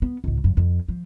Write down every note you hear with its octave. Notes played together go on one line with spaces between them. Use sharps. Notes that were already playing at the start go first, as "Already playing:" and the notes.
B3
C#2 G#2
F#2 F3
F2
F3